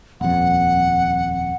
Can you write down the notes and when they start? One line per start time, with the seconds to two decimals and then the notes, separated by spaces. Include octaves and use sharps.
0.21 D#1 F2 F#5